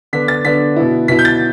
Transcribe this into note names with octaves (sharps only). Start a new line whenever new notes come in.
D3 B3 D4 B6
A6
D3 B3 D4 B6
B2 B3 E4
B2 B3 E4 B6
G6
A6